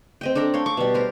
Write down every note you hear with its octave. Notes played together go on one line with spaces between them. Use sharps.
C4 D#5 G5
D4 A4 D5 A#5
C#5 F5 G5
C#6 D6
B2 G3
A#4 C5